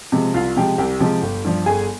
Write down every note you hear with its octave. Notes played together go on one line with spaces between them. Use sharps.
C3 F3 G#3
C2 F4 F5
C3 F3 G#3 G4 G5
C2 G4 G5
C3 F3 G#3
G1
G2 F3
G1 G#4 G#5